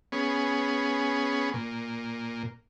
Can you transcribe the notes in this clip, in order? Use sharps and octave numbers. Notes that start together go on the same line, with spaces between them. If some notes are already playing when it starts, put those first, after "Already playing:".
B3 C#4 G#4
A#2